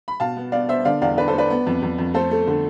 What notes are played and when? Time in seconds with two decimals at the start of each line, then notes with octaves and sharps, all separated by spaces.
0.08 B5
0.20 B2 F5 A5
0.37 B3
0.52 B3 D5 F5
0.69 B3 C5 E5
0.85 D3 D5 F5
1.02 E2 D5 F5
1.17 D3 B4 D5
1.28 A4 C5
1.33 A3
1.38 B4 D5
1.50 B3
1.67 F2
1.82 F2
1.98 F2
2.14 A3 A4 C5
2.31 A3
2.47 D3